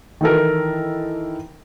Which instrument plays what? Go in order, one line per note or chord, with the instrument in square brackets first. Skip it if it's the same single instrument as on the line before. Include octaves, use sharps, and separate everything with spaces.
[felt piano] D#3 E3 A4 A#4